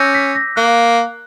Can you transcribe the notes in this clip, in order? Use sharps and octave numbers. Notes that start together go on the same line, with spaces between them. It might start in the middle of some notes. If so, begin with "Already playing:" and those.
Already playing: C#4 D6 E6 G6 A#6
B6
A#6
A#3 F#6